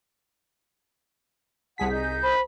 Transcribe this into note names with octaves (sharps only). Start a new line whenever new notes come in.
C2 G#4 F#5 A5 B6
D#4 G6
C5 B5